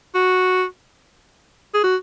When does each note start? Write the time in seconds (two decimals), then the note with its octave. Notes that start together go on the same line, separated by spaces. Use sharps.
0.15 F#4
1.74 G#4
1.83 F#4